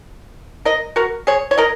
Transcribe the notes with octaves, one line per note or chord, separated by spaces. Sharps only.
A#4 D#5
F#4 A#4
G#4 C#5
C#5
A#4 D#5